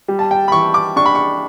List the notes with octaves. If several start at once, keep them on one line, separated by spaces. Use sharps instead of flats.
G3
A5
G5
B5
E3 C#6
D6
D4 C#6
B5
C#6